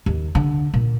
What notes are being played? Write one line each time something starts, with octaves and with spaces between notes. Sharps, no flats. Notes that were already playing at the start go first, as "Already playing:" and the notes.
D#2
D3
A#2